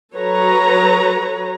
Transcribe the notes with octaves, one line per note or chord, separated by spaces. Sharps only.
F#3 A4 B4 C#5 A#5